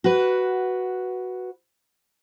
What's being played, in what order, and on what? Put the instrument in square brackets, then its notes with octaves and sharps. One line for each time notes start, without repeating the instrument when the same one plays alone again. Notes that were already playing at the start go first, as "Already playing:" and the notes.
[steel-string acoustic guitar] F#4 B4